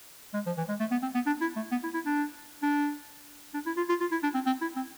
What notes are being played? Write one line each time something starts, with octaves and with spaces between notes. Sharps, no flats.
G#3
F3
E3
G#3
A3
B3
C4
B3
D4
E4
A3
B3
E4
E4
D4
D4
D4
E4
F4
F4
F4
E4
D4
C4
C4
E4
C4